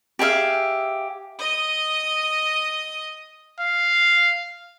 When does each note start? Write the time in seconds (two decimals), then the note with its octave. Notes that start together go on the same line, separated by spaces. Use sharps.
0.19 G4 G#4 E5 F5
1.39 D#5 D#6
3.60 F5